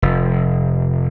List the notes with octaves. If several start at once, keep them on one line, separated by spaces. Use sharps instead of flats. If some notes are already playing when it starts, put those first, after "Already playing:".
F1